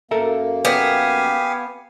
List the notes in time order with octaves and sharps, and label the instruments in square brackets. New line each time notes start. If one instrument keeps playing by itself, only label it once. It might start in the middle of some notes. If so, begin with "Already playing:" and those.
[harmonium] F#2 A#3 [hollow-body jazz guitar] A4 A#4 E5
[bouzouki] B3 [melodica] G4 F5 G#5